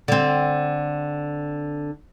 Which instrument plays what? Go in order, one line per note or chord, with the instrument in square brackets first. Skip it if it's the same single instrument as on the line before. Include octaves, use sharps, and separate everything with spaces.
[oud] D3 C4